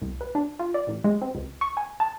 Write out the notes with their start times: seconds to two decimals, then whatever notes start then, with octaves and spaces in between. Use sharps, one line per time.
0.02 C2
0.21 B4
0.35 D4
0.59 F4
0.74 D5
0.87 A1
1.04 G#3
1.22 C4
1.35 C#2
1.61 C#6
1.77 G#5
2.00 A5